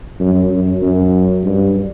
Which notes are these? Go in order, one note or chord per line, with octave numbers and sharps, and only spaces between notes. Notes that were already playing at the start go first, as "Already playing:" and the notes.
F#2
F#2
F#2
G2